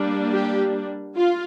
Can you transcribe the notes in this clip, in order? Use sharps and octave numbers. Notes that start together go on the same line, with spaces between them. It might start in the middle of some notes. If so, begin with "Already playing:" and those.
Already playing: G3 A#3 D4
G4
F4